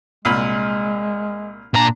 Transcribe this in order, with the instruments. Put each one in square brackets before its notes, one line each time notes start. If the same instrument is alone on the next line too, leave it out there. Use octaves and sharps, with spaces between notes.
[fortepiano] C2 A#2 B5 [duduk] G#3
[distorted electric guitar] A#2 A#5 [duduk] D4